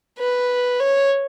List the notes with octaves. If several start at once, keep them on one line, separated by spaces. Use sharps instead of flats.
B4
C#5